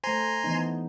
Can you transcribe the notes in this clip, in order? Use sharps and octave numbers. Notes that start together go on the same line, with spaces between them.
A3 C5 G#5 A#5 C6
E3 B3 D#4